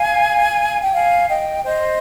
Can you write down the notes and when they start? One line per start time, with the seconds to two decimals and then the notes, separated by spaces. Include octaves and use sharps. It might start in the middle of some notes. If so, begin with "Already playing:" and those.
Already playing: F5 G#5
0.82 G5
0.93 F5 G#5
1.28 D#5 G5
1.63 C5 D#5